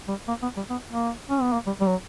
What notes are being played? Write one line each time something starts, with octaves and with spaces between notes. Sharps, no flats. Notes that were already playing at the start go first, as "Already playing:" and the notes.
G3
A#3
B3
G3
B3
A#3
C#4
B3
A#3
G3
G3
F#3